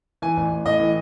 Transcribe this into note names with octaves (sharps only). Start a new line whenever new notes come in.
E3 G#5
A1
A1
A2 D#5
E3